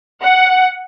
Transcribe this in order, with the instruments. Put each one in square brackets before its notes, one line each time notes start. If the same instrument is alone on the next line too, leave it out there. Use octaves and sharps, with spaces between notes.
[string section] F#5